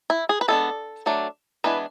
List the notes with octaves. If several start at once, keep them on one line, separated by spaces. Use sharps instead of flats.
E4
G#4
B4
G#3 B3 D4 A4
F#3 A3 D4
E3 G#3 B3 D4 B4